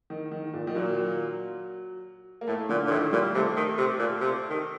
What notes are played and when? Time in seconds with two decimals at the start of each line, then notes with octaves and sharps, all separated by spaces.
0.10 D#3
0.31 D#3
0.54 A#2
0.67 D#3
0.75 A#2 F#3
2.41 A#3
2.47 A2 A3
2.69 A#2 D3
2.87 A#2
2.91 A2 D#3
3.12 A#2 G3
3.34 C3 A3
3.56 D#3
3.77 C3
3.99 A#2
4.21 C3
4.49 D#3